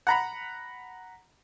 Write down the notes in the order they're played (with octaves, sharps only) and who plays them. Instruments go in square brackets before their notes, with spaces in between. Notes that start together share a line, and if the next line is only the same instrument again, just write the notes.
[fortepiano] F#5 A#5 B5